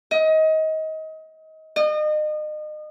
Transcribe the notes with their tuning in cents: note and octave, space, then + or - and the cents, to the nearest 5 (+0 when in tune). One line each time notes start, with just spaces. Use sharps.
D#5 +25
D#5 -35